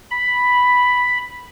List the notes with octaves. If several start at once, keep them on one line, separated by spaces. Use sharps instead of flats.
B5